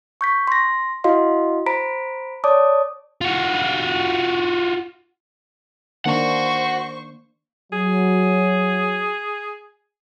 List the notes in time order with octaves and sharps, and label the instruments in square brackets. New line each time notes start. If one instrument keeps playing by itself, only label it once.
[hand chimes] C#6 G6 B6
C6 A#6
E4 F#4 D#5 F5 C6
C5 A#5 B5 B6 D7
C#5 D5 A5 D6 D#6
[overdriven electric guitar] F4 F#4
[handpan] D#3 A#3 D4 [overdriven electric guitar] F#4 F#5 [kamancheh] C5 C#6
[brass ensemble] F#3 [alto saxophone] G#4